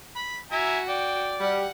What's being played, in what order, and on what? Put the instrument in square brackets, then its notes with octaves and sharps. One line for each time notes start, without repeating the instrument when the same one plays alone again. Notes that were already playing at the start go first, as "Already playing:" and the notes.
[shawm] B5
[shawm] E4 [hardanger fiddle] F#4 [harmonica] E5 G#5 A#5
[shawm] D5 [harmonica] G5
[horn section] G3 [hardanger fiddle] F#5